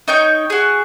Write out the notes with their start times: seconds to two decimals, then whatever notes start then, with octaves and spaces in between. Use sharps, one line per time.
0.08 D#4 C#5 G5 G6
0.50 F#4 G#4